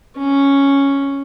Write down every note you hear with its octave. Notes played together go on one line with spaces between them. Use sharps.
C#4